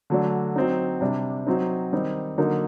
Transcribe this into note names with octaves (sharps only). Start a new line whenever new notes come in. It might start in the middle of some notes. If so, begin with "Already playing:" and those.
D3 F#3 A3 D4
F#3 C4 D#4
C3 G3 D4
F#3 C4 D#4
D#3 G3 C4 D#4
D3 F#3 A#3 D#4